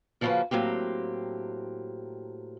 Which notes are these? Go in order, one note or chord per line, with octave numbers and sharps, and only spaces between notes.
C#3 F3 A#3 C#4 F#4 B4
A2 F#3 A#3 C4 G4